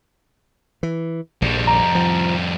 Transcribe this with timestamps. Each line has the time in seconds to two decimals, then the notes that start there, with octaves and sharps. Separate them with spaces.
0.83 E3
1.42 A#1 F2 G3
1.67 A#5
1.95 F3